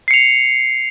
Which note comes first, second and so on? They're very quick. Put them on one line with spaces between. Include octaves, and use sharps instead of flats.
C7 C#7 F7